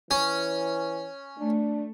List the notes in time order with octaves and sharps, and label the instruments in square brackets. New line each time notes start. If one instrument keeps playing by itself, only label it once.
[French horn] E3 [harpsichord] C#4
[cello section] A3 [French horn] D4